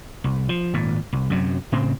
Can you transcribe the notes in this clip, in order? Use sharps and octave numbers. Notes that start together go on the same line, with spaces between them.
C2
F3
G#1 A#2
C2
F#2 C3 F#3
A2 C#3 C4